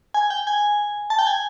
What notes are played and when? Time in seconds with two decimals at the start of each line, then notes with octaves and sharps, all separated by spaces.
0.14 G#5
0.30 G5
0.47 G#5
1.10 A5
1.19 G5
1.27 G#5